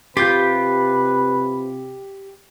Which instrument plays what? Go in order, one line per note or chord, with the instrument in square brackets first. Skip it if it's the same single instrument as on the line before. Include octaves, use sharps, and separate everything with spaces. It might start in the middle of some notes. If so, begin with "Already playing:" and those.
[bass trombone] C3 [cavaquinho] F4 [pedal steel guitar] G4 G6 [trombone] B4